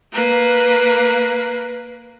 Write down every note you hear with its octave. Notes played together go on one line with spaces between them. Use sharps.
A#3 B4